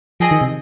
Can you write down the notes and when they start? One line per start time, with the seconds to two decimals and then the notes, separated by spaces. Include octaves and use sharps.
0.20 F3 C4 G#4 D#5
0.31 D#3
0.41 C3